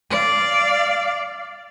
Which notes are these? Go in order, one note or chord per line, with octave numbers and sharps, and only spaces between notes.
D5 F5